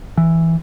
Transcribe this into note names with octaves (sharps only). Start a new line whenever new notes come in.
E3